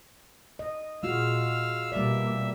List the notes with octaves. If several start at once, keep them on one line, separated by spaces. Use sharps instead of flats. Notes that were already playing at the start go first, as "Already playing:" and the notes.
D#5
A#2 G#3 F4 F#4 F5 E6 F6
B2 G3 A#3 D5 E5